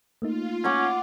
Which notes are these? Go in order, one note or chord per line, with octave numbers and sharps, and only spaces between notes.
A3 A#3 D#4 F4
C#4 F#5 D6